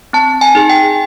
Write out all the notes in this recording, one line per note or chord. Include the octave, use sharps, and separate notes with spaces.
C4 A5
G#5
D#4 G#4
G5